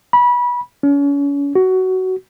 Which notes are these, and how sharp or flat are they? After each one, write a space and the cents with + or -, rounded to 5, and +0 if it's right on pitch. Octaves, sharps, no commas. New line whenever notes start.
B5 -25
C#4 +35
F#4 +15